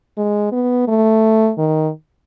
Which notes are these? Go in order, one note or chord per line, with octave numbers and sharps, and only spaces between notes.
G#3
B3
A3
D#3